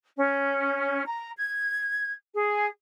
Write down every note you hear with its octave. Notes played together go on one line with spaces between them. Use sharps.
C#4
A#5
G#6
G#4